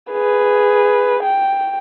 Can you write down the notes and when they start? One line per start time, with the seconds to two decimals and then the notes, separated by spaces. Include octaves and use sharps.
0.12 G#4 B4
1.23 G5